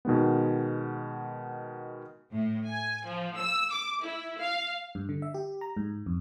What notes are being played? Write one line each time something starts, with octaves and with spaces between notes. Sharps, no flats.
B2 D#3 G#3 B3
A2
G#5
F3
E6
D6
E4
F5
G2
D3
E5
G4
A#5
G#2
F2